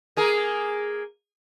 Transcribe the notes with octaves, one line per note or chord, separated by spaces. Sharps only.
A#3 G#4 A#4